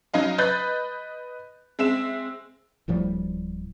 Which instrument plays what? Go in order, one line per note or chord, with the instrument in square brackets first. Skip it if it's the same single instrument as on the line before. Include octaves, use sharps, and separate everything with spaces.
[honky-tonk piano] F#3 D#4 D#5 F5
B4 D#5 B5 F#6 G6 A6
G#3 C4 E5 E7
[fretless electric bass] D1 A2 F3 G3